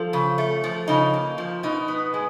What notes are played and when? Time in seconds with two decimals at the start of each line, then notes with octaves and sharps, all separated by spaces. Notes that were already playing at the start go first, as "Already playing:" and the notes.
Already playing: F3 A4
0.13 C#3
0.38 A3
0.64 F3
0.88 C#3 D#4
1.14 A#3
1.38 F3
1.63 B2 D#4
1.88 B3
2.14 G#3